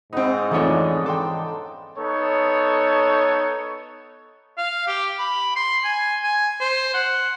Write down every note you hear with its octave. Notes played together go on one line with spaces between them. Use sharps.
G#2 B3 C4 D#4 E4
F2 C#3 E3 A3 D4 D#4 A4 C#5
A4 G5 C6 D6
B3 D#4 A4 C#5
F5
G4
B5
C6
G#5
G#5
C5
F#5